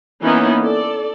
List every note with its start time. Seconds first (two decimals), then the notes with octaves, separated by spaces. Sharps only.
0.23 E3 A#3 B3 C#4 D#4 E4
0.60 A4 D5